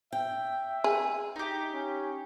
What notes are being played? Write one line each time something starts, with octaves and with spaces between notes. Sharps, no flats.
E5 G5
G#4
D#4 G4
C#4